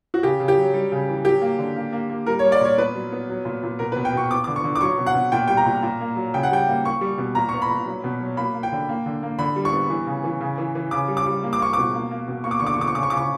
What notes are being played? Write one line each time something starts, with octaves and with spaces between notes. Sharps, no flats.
F#4
C#3 G4
C#3
G4
F#3
G3
C#3
E3
F#3 G4
A#3
D3
A#3
A#3
A#3
G3 A#4
G3 C#5
D5
A#2 C#5
B3 B4
F#3
B3
F#3
A#2
A#2
B2 A#4
B2 B4
G5
B2 C#6
B3 D6
D3 D6
C#6
D3
D6
F#3 C#6
B2
F#5
B2
A#2 G5
G3 G5
A#5
A#2
A#2
A#3
F#3
C#3 G5
F#5
G3 G5
A#3
A#3 C#6
G3
B2
A#2 A#5
B3 C#6
B5
A#2
F#3
B2
F#3
A#3 B5
A#3
G5
D3
A#3
D3
A#3
D3 B5
G3
C#6
B3
E3
C#3
E3
C#3
E3
E3
C#3 D6
G3
D6
G3
A#3
D6
A#3 C#6
B2 D6
A#3
A#3
B2
A#3 C#6
D6
D3 C#6
D6
C#6
D3 D6
C#6
C#3 D6
C#6
C#3 D6
C#6